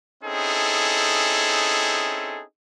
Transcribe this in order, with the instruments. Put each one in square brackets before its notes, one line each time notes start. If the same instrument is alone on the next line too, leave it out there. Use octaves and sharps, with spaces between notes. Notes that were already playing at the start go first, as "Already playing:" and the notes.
[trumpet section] C4 C#4 D#4 E4 G#4 A4